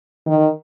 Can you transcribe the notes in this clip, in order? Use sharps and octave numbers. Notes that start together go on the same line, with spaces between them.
D#3